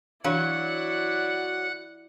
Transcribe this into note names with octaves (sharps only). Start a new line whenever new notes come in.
E3 F#3 D4 E4 D5 F5 F#5 F#6